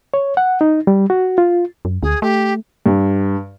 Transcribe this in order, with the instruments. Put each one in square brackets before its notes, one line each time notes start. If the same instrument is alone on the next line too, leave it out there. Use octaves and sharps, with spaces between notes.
[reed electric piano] C#5
F#5
D#4
G3
F#4
F4
[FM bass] F#2
[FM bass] D2 [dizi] G#4
[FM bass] A3 [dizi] G4
[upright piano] G2